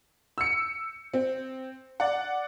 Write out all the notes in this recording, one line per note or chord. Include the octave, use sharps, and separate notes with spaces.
E6 C#7
C4
D5 F#5